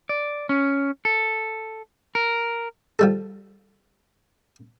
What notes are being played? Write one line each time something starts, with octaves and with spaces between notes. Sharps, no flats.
D5
C#4
A4
A#4
F3 G3 A4